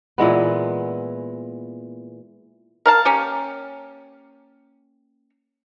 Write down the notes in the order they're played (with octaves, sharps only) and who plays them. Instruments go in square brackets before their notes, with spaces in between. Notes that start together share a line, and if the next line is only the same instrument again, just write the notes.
[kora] A#2 E3 G#3 B3
[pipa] A#4 F5 A5
A#3 C#4 G4